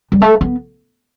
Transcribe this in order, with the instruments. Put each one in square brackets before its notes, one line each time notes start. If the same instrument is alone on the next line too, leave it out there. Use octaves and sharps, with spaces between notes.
[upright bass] G3
[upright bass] A3 [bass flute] A4
[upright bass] B3